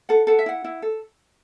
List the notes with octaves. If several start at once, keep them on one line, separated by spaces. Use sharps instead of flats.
A4 F#5
A4 F#5
E5
E4 F#5
E4
A4